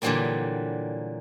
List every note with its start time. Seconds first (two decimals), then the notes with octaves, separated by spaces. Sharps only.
0.02 A#2 D3 E3 F#3 G3 A#3